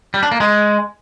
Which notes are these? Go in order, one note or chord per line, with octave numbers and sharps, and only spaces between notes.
G3
D4
A#3
G#3